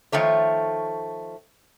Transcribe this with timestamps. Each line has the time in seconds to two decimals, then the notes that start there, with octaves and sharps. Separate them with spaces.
0.12 D#3 F3 A3 C#5